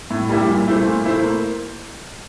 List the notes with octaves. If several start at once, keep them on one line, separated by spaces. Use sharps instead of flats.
A2
G3 A#3 E4 G4
A#2
A3 E4 A4 C5
A#2
A3 E4 A4 C5
A#3